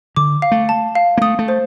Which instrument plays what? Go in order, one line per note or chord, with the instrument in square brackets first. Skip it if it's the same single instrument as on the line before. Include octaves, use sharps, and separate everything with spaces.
[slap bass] D3 [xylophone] D6
[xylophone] F5
[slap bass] A3
[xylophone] A5
F5
[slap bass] A#3
[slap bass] A3 [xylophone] D#6
[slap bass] A3
[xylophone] C5